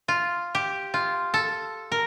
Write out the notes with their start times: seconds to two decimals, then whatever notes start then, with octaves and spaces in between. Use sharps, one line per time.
0.08 F4
0.55 G4
0.94 F4
1.34 A4
1.92 A#4